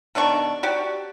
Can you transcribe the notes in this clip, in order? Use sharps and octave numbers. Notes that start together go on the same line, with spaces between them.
B2 D#3 D4 C#6
F#4 G4 D5